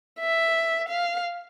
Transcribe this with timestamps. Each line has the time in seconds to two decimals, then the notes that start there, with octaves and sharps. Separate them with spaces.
0.20 E5
0.89 F5